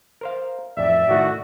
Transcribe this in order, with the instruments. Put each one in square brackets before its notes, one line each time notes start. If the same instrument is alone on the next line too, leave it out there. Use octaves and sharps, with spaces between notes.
[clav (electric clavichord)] A#4 C5 F5
[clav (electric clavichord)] A1 F2 [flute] D5 [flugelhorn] E5
[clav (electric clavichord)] A2 D#3 A3 [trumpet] F#4